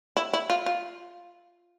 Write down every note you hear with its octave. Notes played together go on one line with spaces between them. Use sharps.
E4
E4
F4
F4